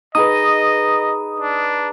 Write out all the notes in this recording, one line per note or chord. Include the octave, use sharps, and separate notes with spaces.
D#4 G#4 B4 D#5 D#6
D4